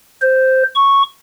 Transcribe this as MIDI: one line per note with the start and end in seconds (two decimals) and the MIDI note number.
0.22 0.63 72
0.75 1.02 85